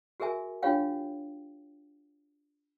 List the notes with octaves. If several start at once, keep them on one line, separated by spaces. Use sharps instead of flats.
F#4 G#4 A#4 E5 G#5
D4 F4 G4 C#5 F5 G5